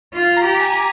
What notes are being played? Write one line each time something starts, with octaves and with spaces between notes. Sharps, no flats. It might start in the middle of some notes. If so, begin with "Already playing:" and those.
F4
A#5
G4
G#5